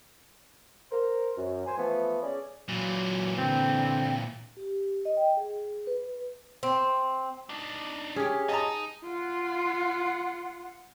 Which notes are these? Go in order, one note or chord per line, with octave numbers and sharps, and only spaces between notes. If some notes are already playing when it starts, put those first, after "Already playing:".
A#4 C5
F#2
C5 G#5
E3 F3 A3 B3
C#4 G#4 D5
A#2 E3 F#3
D3 C4
G4
D#5
G5
G#4
B4
C4
D4 D#4
C#4 G4 G#4
D#4 D#5 A5 A#5
F4 F#5